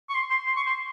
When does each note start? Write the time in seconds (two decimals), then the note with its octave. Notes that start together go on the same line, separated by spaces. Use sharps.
0.09 C#6
0.15 C6
0.30 C6
0.46 C6
0.57 C#6
0.67 C6